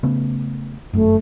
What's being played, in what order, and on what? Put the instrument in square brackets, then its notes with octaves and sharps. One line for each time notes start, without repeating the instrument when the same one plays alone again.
[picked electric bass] C#3 A3 B3
[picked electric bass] G1 F#2 [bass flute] A3